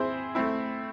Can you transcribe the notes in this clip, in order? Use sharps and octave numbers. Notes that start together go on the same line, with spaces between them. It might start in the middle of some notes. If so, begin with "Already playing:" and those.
Already playing: C4 E4 G#4 C5
A3 C4 E4